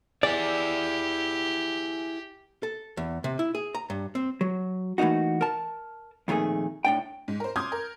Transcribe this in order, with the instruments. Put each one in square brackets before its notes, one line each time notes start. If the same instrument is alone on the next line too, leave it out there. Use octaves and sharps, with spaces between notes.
[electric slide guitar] E4 G#4 [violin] G4 [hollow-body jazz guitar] D5
[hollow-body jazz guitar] A4
E2
C3
E4
G#4
A#5
G2
C4
F#3
E3 A3 A#3 D#4 F#4
A#4 A5
F2 A#2 D#3 A3 G#4
A2 D4 G5
[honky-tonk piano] G#2
A#4 C5
C6 D6 D#6 F6 G6 G#6
A#4